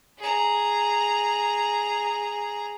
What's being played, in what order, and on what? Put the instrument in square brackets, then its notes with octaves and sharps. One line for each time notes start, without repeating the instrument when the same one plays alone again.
[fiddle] G#4 A#5